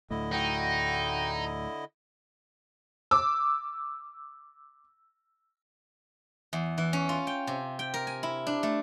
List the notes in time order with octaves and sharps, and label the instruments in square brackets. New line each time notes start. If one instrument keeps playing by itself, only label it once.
[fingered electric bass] D2 A2 [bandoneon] D3 E4 D#5
[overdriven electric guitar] D#4 [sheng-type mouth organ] F#4 G5
[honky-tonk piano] D6 E6
[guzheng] E2
E3
C#4
F4
G5
C3
G5
A#4
G#5
E4
D4
A3